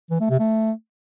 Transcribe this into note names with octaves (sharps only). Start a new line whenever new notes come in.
E3
A3
C3
A3